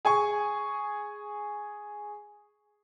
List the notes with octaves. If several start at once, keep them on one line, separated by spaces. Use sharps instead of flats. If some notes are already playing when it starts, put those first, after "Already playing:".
G#4 G#5 C#6